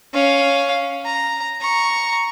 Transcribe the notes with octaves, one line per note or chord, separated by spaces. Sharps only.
C#4 F5
A#5
A#5 C#6